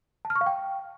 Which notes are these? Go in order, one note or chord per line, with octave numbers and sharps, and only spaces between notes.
A5
F6
C#6
F5
G5